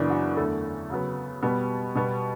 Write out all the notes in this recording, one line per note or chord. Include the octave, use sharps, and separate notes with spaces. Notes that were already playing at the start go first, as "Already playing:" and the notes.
Already playing: F#2 C#3 E3 B3 D4
F#4
E2 D3 A3 A4
C#3 F#3 B3
B2 G3 B3
B2 G3 B3